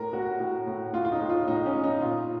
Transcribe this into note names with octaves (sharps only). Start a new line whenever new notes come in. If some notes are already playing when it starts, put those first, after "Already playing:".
Already playing: A2 A#4
A2 F#4
A2
A2
A2 F4
F4
D#4
A2
F4
A2 D#4
C#4
A2
D#4
A#2 F4